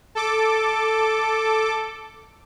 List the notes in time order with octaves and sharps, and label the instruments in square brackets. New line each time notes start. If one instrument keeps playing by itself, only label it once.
[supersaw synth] A4 D6